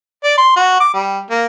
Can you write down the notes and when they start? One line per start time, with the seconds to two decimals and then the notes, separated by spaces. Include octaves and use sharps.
0.24 D5
0.38 C6
0.56 F#4
0.80 D6
0.94 G3
1.30 A#3